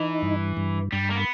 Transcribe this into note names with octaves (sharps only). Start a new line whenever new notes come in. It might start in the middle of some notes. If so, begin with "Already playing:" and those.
Already playing: E3 D#4
G2
G2
G2 G3
A#3
B3